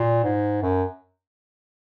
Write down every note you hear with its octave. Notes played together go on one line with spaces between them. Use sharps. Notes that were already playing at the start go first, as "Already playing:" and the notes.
Already playing: A#2
G#2
F#2